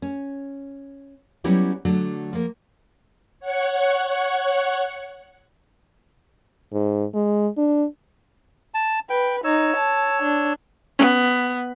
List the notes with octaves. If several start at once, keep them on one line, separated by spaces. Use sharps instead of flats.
C#4
F#3 G3 B3 C#4 E4 G4
D3 F#3 A3 D4
F3 A#3
C#5 F#5 C#6
G#2
G#3
D4
A5
B4 G5
D#4 C#5 E6
A5
D4
B3 C#4